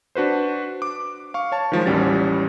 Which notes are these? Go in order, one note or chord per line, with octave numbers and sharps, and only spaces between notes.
D4 F#4 B4 C5
D6
F5 C#6
C#5 A5
D#3 F3 G#3
A1 D#2 G3 C#4 F#4 A6